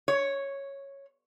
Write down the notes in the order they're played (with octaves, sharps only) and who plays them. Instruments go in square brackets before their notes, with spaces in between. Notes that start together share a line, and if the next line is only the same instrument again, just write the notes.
[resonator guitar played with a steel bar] C#5